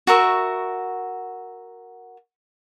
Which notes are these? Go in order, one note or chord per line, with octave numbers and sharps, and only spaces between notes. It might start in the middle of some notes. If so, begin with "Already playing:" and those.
F#4 A#4 E5 C#6